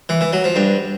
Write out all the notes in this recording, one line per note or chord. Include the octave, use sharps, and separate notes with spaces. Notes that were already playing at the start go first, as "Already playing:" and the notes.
E3
E3
F#3
F3
G2